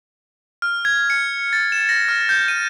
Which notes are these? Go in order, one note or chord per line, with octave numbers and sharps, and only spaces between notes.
F6
G#6
C#7
A6
E7
A#6
F6
G6
D#7